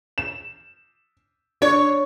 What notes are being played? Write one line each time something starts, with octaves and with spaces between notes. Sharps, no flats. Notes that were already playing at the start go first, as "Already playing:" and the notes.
E7
D4 C#5